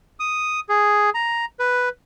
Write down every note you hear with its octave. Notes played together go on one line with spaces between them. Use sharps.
D#6
G#4
A#5
B4